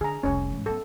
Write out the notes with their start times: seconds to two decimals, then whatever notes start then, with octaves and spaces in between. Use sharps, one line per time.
0.01 D3 G#4 A#5
0.23 F1 C2 C#4 C#5
0.52 G#2 E3
0.66 F#3 B3 A4